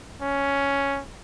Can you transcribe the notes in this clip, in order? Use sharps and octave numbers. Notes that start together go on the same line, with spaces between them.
C#4